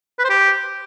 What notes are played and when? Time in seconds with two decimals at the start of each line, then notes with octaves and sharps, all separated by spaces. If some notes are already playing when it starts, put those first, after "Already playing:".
0.19 B4
0.24 C5
0.30 G4